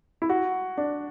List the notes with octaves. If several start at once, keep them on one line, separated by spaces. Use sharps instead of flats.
E4
F#4
D4